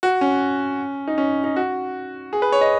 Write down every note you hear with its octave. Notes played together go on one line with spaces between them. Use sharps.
F#4
C#4
D#4
C#4
D#4
F#4
G#4
B4
C#5
D#5